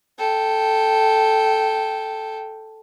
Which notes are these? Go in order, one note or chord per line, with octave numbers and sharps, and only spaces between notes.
A4 G5